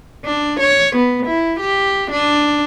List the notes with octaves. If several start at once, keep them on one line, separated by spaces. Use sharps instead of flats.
D4
C#5
B3
E4
G4
D4